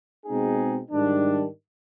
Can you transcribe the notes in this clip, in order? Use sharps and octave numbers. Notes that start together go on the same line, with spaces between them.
B2 G#3 C4 D#4 G#4
G#2 D#3 G3 D4